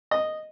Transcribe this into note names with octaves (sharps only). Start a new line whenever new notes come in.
D#5